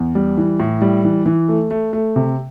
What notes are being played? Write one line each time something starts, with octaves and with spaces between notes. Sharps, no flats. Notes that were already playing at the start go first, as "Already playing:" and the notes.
Already playing: E2
G3
E3
A2
G3
E3
E3
A3
A3
A3
C3